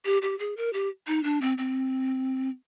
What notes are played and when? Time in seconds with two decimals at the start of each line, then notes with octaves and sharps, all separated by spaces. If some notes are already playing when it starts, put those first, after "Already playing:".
0.05 G4
0.22 G4
0.39 G#4
0.57 A#4
0.73 G4
1.07 D#4
1.24 D4
1.42 C4
1.58 C4